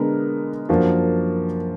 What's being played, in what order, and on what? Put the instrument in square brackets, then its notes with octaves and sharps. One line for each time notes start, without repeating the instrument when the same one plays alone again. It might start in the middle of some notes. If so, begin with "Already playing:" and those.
Already playing: [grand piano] D3 G#3 B3 D4 A#4
F#2 F3 A#3 D4 F#4